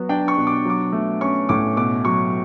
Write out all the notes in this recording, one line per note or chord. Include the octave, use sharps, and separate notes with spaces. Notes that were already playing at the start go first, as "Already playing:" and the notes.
Already playing: F#3 B3
D4 G5
C#6
B2
D6
F#3 D6
A3
C#4 C#6
A2 D6
B2 D6
F#3 C#6